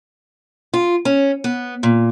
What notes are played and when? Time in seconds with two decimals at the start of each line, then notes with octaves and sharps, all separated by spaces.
0.74 F4
1.05 C#4
1.44 B3
1.83 A#2